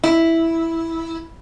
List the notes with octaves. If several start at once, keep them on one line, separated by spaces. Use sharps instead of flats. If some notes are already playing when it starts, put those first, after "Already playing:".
E4